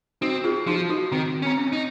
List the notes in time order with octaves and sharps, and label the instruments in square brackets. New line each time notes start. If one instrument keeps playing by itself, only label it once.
[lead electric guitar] C4 [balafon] D#4 F#4
[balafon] F4 G#4
[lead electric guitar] F3 [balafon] D#4 F#4
[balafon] D#4 F#4
[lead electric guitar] D#3 [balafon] C4
[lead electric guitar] C#4
[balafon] C4
C#4
[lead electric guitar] D#4